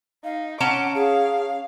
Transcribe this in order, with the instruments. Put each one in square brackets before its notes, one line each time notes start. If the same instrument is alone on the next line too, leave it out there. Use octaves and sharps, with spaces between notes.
[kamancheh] D#4 [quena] F5
[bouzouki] C#4 A5 A#5 [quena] F#5 [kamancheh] D6
[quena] G#4 [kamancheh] F5